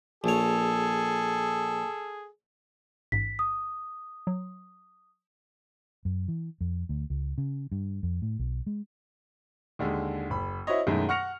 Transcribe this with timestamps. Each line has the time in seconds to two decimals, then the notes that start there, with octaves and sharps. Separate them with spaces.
0.24 A#1 G#4 A4 C#5
3.12 A1 G#2 B6
3.39 D#6
4.27 F#3
6.05 F#2
6.28 E3
6.61 F2
6.89 D2
7.10 C#2
7.38 C#3
7.72 G2
8.03 F2
8.22 A2
8.39 B1
8.67 G#3
9.79 D#2 D3 G#3
10.30 F#1 B5
10.67 E4 F#4 C5 C#5 D#5
10.87 F#2 B2 D#3 G#3 A3 E4
11.09 F#5 C#6 F6 A#6 C#7 F7